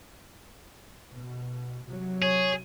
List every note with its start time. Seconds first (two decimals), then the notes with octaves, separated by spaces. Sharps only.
1.12 B2
1.85 C3 F#3
2.22 G#4 C#5